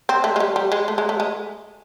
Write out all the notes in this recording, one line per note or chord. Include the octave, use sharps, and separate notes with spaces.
C4
A3
G#3
G3
G3
G#3
A3
G#3
A3
G#3